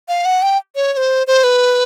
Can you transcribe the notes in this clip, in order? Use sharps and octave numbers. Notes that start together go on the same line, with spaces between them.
F5
F#5
G5
C#5
C#5
C5
C5
B4